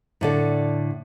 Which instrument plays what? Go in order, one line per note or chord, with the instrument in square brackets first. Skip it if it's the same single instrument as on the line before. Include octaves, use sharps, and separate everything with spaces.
[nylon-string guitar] A2 D3 D5